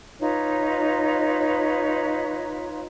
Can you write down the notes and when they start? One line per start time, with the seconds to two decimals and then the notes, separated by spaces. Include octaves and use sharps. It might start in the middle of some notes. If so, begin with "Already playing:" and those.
0.20 D#4 F4 B4 C#5